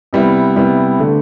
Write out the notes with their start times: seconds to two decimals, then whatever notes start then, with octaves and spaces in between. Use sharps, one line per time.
0.13 C3 G3 B3 E4
0.56 C3 G3 B3 E4
0.99 D3 A3